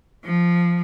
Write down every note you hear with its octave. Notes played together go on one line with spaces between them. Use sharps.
F3